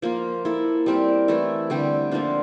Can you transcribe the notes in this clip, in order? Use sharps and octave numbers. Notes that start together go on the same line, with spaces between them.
F3 A#3 F4
A#3 E4 A4
G3 C4 G4 A#4
E3 A3 E4 A4
D3 G3 C4 G4
F3 A#3 D4 F4